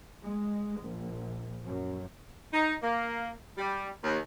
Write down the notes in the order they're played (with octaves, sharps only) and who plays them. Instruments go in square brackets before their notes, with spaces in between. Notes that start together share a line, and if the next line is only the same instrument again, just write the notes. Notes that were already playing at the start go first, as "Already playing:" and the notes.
[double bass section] G#3
A#1
F#2
[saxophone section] D#4
A#3
G3
D#2